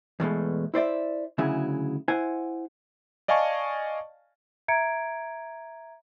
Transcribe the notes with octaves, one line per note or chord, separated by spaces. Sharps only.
E2 B2 G#3 A3
E4 C5 D5 E5
D2 C#3 F#3 E4 G#4
E4 C5 F#5 G#5
D5 D#5 F5 G#5 A5 C#6
E5 A#5 G#6 C#7 D7